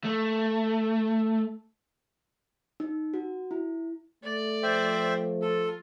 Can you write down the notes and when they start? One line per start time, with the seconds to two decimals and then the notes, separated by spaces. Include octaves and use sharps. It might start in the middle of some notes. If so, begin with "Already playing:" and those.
0.04 A3
2.80 D#4
3.14 F#4
3.51 E4
4.24 A3 D5
4.63 F3 C5 E5 G5
5.42 F4 A4